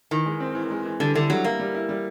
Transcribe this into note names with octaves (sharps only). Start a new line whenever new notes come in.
D#3 E3
G#3
C4
E3
G#3
E3
D3 G3
D3 E4
F#3 G3
A#3 E4
G3
E4
G3